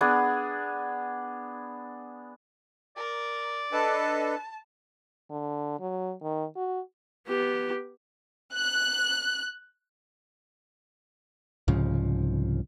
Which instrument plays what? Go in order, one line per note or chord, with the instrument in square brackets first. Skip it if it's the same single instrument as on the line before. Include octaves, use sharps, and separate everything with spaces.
[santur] B3 D4 G#4 G#5
[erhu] A#4 [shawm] D5
[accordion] D4 A4 B4 [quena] D#5 [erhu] A5
[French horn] D3
F#3
D#3
F#4
[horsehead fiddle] B3 G4
[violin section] F#6
[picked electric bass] C2 G#2 C#3 F3